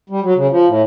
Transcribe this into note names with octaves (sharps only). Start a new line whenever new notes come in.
G3
F#3
C#3
F3
A2